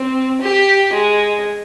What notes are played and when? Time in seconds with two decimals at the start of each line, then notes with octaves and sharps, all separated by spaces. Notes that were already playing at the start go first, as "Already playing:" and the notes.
Already playing: C4
0.41 G4
0.93 G#3